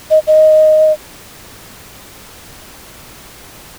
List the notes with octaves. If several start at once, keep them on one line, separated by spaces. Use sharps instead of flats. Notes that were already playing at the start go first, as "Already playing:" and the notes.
D#5
D#5